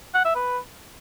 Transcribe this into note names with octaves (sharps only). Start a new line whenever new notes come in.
F#5
E5
B4